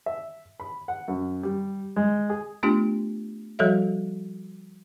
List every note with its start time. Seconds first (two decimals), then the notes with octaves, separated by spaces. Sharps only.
0.06 E5
0.60 B5
0.88 F#5
1.08 F#2
1.43 G3
1.96 G#3
2.30 G#4
2.63 A3 B3 D4 F4 G4
3.59 F3 G3 F#4 A4 C#5 E5